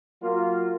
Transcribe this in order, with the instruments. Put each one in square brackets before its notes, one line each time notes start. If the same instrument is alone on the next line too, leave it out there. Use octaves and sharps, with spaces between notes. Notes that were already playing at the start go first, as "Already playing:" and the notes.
[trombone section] F#3 A#3 F4